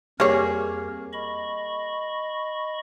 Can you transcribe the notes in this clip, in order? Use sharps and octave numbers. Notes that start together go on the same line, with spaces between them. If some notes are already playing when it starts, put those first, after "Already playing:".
F2 G3 A#3 G#4 A#4 C#5
D#5 B5 C#6